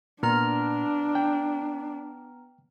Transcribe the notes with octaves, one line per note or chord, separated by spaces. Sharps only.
A#2 B3 D4 A#5 F6
G5